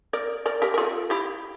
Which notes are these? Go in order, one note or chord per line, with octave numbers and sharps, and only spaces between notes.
A#4 D5
A#4 D5
G4 A#4
A#4
F4 A4
E4 G4